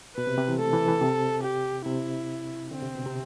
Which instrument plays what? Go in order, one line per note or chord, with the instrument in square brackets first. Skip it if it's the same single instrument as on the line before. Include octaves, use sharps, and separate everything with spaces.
[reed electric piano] B2 [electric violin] B4
[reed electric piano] C3
C3
E3
[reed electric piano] A3 [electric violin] A4
[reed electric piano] E3
E3
C3
[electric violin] G4
[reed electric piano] C3 [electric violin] E4
[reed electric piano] D3 [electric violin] C4
[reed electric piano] C3
B2
C3